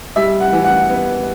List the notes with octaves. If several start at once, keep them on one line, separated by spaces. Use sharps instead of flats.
G3 E5
F#5
E3
F#5
B3